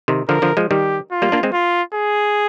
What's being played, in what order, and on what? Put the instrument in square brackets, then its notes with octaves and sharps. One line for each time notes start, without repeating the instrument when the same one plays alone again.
[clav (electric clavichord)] C3 D#3
[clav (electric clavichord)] D3 F3 [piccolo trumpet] A#4
[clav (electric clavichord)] D3 F3
F3 G#3
[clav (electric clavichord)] D#3 G3 [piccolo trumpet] G4
[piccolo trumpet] F4
[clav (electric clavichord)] G3 A#3
A#3 D4
G#3 C4
[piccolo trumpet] F4
G#4